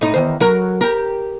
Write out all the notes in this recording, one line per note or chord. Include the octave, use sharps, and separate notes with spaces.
A2 D#4
E2 D#3 C5
F#3 A#4
G4 A#4